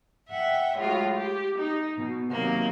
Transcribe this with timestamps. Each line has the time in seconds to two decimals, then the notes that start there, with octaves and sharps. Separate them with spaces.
0.29 E5 F#5 G5
0.76 A2 G#3 F4 F#4
1.12 G4
1.57 D#4
1.96 B2
2.29 C3 D#3 F#3 A#3